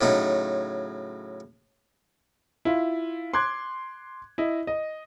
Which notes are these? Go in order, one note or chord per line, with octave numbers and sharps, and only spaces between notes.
A2 C#3 F#3 D#4
E4 F4
C6 D6 F#6 G#6
E4 D#5
D#5